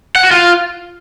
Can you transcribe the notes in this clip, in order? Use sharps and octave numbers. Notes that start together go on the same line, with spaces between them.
F#5
F#4
F4